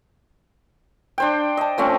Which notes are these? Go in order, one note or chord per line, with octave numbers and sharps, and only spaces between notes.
D4 C5 G5
D#5 A5
F3 A3 C4 C#4